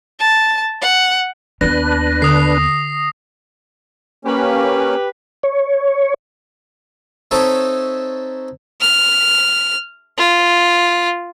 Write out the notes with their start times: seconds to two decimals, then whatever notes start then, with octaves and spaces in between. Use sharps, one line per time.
0.20 A5
0.82 F#5
1.61 D#2 B3 D4 B4 A#6
2.22 D3 D#6 C7
4.25 A#3 C#4 G4 B4
5.43 C#5
7.31 C4 D#4 A4 C#5 E5 A5
8.81 F6
10.18 F4